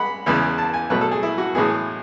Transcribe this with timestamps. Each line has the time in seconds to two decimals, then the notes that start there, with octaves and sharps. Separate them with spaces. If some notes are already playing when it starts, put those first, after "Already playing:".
Already playing: G#3 F#5 B5
0.26 E2 C#3 E3 G#3 B3
0.58 A5
0.74 G#5
0.90 B2 F#3 A3 B4
1.01 A4
1.11 G#4
1.23 E4
1.38 F#4
1.55 A2 E3 G#3 B3 G#4